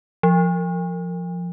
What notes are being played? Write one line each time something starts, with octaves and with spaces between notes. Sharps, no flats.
F3